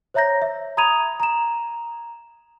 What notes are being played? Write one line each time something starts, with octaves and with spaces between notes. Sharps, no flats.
C5 C#5 E5 A#5 G6 A#6
E5
A#5 B5 D#6 G#6 D#7 F7
A#5 E7